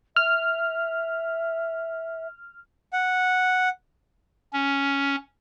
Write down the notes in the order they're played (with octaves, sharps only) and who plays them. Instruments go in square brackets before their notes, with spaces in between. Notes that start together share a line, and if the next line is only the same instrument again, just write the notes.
[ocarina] E5 [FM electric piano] F6
[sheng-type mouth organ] F#5
[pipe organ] C#4